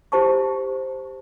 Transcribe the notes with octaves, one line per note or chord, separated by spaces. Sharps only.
E4 G4 C5 A5 C#6